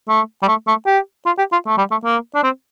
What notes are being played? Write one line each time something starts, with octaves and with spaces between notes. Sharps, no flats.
A3
G3
A3
A3
G4
F4
G4
F4
A3
G3
A3
A#3
D4
C4